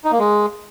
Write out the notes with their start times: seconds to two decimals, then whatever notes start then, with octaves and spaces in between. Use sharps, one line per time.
0.04 D#4
0.12 A#3
0.19 G#3